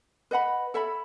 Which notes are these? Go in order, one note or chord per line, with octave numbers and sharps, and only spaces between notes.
B4 D#5 F#5 B5
A4 C#5 E5 B5